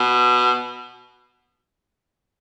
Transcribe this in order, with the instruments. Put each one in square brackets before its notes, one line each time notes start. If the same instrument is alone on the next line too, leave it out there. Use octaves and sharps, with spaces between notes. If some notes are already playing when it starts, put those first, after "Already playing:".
Already playing: [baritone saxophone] B2